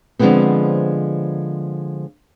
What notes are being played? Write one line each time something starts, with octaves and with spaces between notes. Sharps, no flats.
D3 F3 F#3 G#3 B3 C4